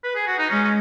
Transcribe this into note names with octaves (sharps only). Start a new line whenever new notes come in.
B4
G#4
F#4
D#4
G#3 C#4
C#4